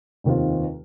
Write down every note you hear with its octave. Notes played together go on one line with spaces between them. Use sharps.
F1 D#2 D#3 C4 F4